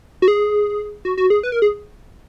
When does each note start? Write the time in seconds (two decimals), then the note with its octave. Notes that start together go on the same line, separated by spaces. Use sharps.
0.22 F#4
0.28 G#4
1.05 F#4
1.18 F#4
1.30 G#4
1.43 B4
1.52 A#4
1.62 G#4